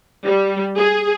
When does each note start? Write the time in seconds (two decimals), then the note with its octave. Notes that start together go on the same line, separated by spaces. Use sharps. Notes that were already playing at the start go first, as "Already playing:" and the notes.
0.25 G3
0.77 G#4